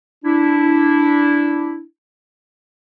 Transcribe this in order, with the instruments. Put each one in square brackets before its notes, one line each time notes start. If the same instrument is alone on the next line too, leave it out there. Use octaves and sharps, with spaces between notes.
[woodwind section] D4 E4